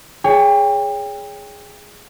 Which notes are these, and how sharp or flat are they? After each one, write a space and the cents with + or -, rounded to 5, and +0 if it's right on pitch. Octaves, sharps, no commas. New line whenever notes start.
G#4 +0 C#5 +20 G5 +30